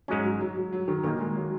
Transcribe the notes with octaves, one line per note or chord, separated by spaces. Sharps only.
G#2 F#3 G#3 C#4
F#3
F#3
F#3
F#3
D#3
A#2 D#3 A#3 D#4
G#3
F#3